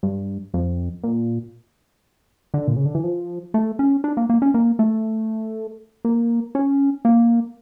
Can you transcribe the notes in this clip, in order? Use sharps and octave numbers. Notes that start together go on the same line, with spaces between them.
G2
F2
A#2
D3
A#2
C#3
D3
E3
F3
A3
C#4
D4
A#3
A#3
C#4
A#3
A3
A#3
C#4
A#3